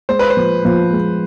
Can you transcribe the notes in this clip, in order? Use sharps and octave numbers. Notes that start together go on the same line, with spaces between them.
G#3 C5
B4
C5
F3
F3
G#3